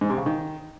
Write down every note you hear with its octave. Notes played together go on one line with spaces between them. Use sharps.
G#2
C3
C#3
D#3